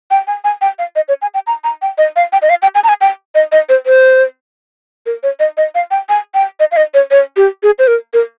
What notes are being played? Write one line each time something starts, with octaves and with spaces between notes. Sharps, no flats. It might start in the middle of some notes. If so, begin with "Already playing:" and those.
G5
G#5
G#5
G5
F5
D#5
C#5
G#5
G5
A#5
A#5
G5
D#5
F5
G5
D#5
F5
G5
G#5
A#5
G#5
G5
D#5
D#5
C5
C5
A#4
C#5
D#5
D#5
F5
G5
G#5
G5
D#5
F5
D#5
C#5
C#5
G4
G#4
C5
A#4
A#4